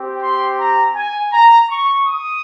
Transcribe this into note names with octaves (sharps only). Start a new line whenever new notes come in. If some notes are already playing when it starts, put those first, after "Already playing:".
Already playing: C4 G4
C6
A#5
G#5
A#5
C#6
D#6